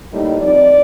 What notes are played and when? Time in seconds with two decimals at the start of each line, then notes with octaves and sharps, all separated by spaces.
0.11 A2 G3 A#3 D#4
0.41 F3 C4 D#4 D5